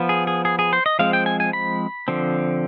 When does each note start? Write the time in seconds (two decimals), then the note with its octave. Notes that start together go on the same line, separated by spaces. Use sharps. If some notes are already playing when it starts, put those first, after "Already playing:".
Already playing: F3 B3
0.09 G#4
0.27 G#4
0.45 G#4
0.59 G#4
0.73 C5
0.86 D#5
0.99 F3 G#3 C4 F5
1.13 G5
1.26 G#5
1.40 G#5
1.53 B5
2.08 D3 F3 C4